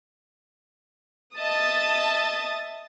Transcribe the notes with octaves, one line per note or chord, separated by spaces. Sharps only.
D#5 E5 A5 D#6 A6